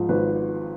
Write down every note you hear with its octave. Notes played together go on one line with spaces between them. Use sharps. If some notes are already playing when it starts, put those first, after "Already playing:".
Already playing: G#2 F3
G#1 B4